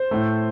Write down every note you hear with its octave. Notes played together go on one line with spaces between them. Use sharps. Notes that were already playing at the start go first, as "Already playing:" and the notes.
Already playing: C5
A2 A3